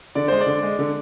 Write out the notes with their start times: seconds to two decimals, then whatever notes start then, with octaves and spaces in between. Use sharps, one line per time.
0.15 D3 D5
0.28 G#3 C5
0.40 D5
0.47 D3
0.63 G#3
0.79 D3